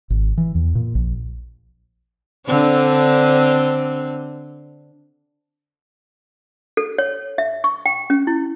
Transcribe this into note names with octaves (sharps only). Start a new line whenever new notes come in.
G#1
E3
E2
A#2
A#1
D3 C4 D4
A4
C#5
E5
C#6
G5
C#4
E4